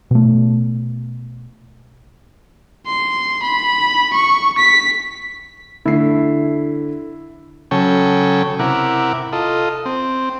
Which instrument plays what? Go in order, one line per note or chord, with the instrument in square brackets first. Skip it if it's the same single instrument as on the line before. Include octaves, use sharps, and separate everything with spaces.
[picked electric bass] B2 A3
[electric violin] C6
B5
C#6
B6
[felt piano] D3 A3 C7 [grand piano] E4
[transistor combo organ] C#3 F#3 C#4 A4 C#5 G5
C3 E4 A#4 F#5 D6
F4 A4 D#5
C4